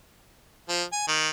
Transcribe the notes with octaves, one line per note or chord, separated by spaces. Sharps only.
F3
G#5
D#3